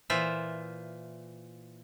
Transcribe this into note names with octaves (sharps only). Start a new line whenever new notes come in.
A#2 E3 F4 C5 E5